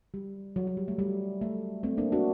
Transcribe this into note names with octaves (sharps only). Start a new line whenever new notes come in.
G3
F#3
F#3
G3
A3
G3
A3
A3 C4
A#3 D4
D4 F#4